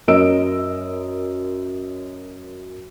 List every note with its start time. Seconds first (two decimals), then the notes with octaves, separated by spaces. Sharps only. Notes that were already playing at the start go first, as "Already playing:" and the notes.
0.08 F#2 C#4 A#4 D#5 E6 D7